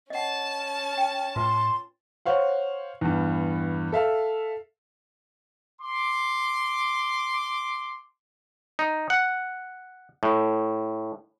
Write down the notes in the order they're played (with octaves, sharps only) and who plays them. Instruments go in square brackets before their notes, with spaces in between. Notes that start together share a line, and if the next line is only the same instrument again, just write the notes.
[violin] C#4 A5 [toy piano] D#5 F#5
[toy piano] G5
[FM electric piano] A2 [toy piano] F4 B4 [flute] C6
[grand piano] C5 C#5 F5 F#5
E2 G2
A4 E5 F5
[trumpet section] C6 D6
[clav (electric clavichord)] D#4
F#5
A2